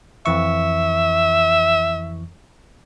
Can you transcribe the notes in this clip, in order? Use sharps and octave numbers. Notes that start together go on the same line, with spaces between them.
F2 E3 E5 C#6